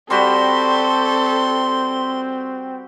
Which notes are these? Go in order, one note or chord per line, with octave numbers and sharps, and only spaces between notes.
G3 C4 F#4 G4 A4 C6